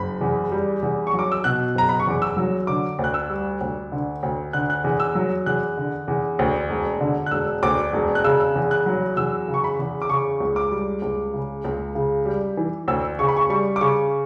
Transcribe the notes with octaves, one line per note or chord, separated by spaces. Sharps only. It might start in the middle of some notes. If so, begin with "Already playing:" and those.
Already playing: F#1 B5
E2
G3
E2
C#6
F#3
D6
E6
B2 F#6
F#1 A#5
B5
C#6
E2 D6
E6
F#3
D3 D6
D2
F#6
E6
G3
D2
D3
D2
D3 F#6
F#6
E2
E6
F#3
E2 F#6
D3
E2
D2
E1
D3
F#6
E1 E6
D2 D6
E1
F#6
C#3 E6
E2
F#6
F#3
E2 E6
C#3
C#6
B5
E2
D6
C#3 C#6
C#2
D6
G3
C#2
C#3
C#2
C#3
G3
E3
D2 E6
C#3 C#6
B5
C#6
G3 C#6
D6
C#3 C#6